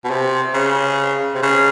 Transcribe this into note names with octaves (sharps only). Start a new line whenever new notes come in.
B2
C3
C#3
C3
C#3